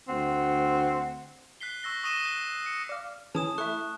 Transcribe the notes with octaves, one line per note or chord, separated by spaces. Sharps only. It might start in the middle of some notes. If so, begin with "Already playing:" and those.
D2 C4 F#5
F#6 B6 C7 G7
C#6 E6 A#6 G7
C#6 D#6 A#6 D#7 E7 G7
F#6 A#6
C#7
D5 F5
E3 C#4 G#4 A5 D#6 E7
A3 E4 C#6 F#6